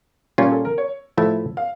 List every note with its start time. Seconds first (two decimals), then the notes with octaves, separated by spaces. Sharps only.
0.38 A#2 G3 C#4 F4 C#5
0.51 A4
0.65 A#4
0.78 C#5
1.17 A2 F3 A3 E4 E5
1.57 F5